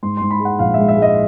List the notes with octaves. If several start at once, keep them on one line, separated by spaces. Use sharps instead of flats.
G#2 C6
G#2 C6
B5
G#3
F#5
A#1 F5
G#3 E5
E5
G#3
D#5